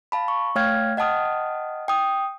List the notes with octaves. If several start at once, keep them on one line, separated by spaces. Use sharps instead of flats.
F5 A5 B5
C#6
A3 C#5 F5 G5 F6 G#6
D#5 F#5 G5 A5 D#6 F6
G5 D#6